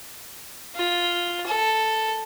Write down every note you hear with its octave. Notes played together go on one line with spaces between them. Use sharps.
F4
A4